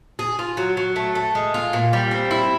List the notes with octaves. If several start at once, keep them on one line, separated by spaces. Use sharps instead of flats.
G#4
F4
F#3
F#3
A3
A3
G#3
F4
A#2
G3
C4
E4